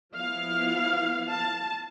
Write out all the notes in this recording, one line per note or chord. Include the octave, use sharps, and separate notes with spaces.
F3 B3 E4 F5
A5